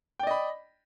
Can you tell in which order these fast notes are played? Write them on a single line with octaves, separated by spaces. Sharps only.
G5 D5 D#5 B5